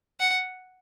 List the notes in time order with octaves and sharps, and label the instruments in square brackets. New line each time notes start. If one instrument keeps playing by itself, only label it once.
[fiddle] F#5